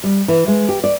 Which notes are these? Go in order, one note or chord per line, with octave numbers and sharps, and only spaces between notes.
G3
E3
G#3
G4
D5